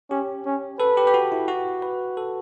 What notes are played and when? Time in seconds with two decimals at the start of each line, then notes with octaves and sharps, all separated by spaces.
0.10 C#4 G4
0.46 C#4
0.79 A4 B4
0.97 G4
1.07 G4
1.14 F#4
1.32 E4
1.48 F#4
1.82 B4
2.17 A4